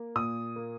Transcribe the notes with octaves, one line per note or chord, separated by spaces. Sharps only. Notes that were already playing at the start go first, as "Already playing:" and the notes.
Already playing: A#3
A#2 D#6
A#3